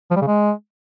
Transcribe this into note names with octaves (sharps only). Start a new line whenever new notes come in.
F3
G3
C#3
G#3